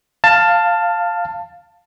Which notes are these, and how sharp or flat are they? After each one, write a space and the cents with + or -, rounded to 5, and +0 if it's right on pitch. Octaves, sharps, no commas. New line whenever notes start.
F5 +0 A5 +15